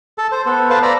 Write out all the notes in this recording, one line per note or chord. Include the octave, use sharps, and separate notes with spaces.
A4 A5
C5
B3 A4
B4 C5 F5 A5
D5 A#5 B5